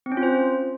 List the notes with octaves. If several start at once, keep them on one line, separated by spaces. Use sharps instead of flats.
C4
C#4
F4
C5